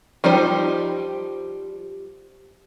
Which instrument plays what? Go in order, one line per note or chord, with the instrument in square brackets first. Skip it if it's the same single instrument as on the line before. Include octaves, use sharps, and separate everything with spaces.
[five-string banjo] F3 G3 D#4 C5